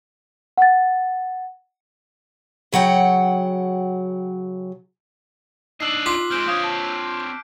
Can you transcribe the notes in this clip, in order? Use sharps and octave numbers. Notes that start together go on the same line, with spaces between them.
F#5 A6
C#3 F#3 F#5 G5
D4 D#4 D#5 E6 F#6 C7 F#7
F4 D6 B6
G#3 C4 F6 G6 D7
C4 C#5 F5 D#6 G6
A5